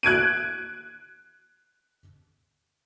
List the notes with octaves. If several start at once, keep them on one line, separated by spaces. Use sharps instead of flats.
F#6 G#6 D7 D#7